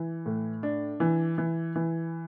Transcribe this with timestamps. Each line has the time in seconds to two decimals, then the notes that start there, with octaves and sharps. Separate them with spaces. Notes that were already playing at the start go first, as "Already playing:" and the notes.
Already playing: E3
0.26 A2
0.63 D4
1.00 E3
1.38 E3
1.76 E3